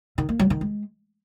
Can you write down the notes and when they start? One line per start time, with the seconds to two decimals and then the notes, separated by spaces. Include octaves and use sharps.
0.18 D#3
0.29 A#3
0.39 F#3
0.50 D#3
0.61 G#3